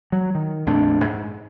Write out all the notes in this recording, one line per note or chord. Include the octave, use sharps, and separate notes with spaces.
F#3
D#3
A#1 F2 A3 D4
G#2